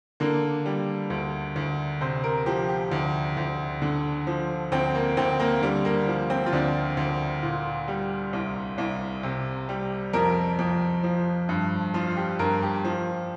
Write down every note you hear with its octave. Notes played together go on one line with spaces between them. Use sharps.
D3 A#3
G3
D2
D2
C3 C5
A#4
F3 G4
G4
D2
D2
D3
F3
D2 C4
A#3
D2 C4
A#3
D3 G3
A#3
F3
C4
F4
D2 D4
D2
A#2
G3
C2
C2
C3
G3
F2 A#4
F2
F3
G2
F3 F4
G4
G2 A#4
G4
F3